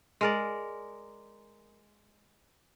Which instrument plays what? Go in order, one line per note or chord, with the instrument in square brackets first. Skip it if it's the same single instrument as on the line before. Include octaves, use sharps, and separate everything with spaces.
[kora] G#3 A#4 D5